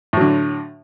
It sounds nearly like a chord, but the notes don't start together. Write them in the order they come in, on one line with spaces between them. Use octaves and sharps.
A2 F#3 D3